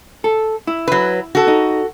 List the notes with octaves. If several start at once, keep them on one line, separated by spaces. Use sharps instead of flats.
A4
E4
F#3 B4
F#4 A4
D#4